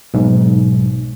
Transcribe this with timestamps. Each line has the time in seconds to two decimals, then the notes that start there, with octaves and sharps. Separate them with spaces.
0.14 B1 G#2